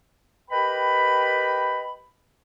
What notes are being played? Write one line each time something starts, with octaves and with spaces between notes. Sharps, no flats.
G4 A#4 B4 D#5 G5 B5